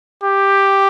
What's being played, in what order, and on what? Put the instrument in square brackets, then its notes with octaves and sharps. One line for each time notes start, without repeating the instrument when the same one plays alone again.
[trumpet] G4